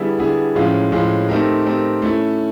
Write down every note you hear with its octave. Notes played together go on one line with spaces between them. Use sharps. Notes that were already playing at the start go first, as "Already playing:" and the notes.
Already playing: D3 G3 B3 E4 G#4
D3 G3 B3 E4 G#4
A2 F3 G#3 C#4 F4
A2 F3 G#3 C#4 F4
A3 C4 D#4 G4 A#4
A3 C4 D#4 G4 A#4
A3 C#4 E4